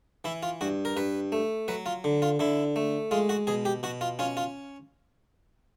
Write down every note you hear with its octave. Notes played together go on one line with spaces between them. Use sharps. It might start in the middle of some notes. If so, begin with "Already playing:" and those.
E3 E4
F4
G2 F#4
A#4
G2 B4
A3
F#3 B4
F4
D3
F4
D3 E4
A3
G#3 F4
F#4
B2 G#4
G4
B2 F#4
F4
C#4 F4
F4